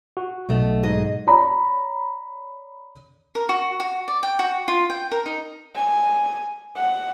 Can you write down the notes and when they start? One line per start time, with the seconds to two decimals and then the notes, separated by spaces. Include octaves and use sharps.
0.17 F#4
0.49 B1 B2 A3
0.83 G#2 G#4 D#5
1.27 C#5 D5 A#5 B5
3.35 A#4
3.49 F#4
3.80 F#4
4.08 D5
4.23 G5
4.39 F#4
4.68 F4
4.90 G5
5.12 A#4
5.26 D#4
5.75 G#5
6.76 F#5